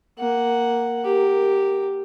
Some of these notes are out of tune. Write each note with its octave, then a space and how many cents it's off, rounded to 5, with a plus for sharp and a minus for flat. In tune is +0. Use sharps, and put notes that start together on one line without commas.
A#3 +0 F#5 +0
G4 +0 A#4 -10